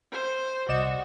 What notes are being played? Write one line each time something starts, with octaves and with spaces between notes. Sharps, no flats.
C5
C2 F#4 D5 D#5 E7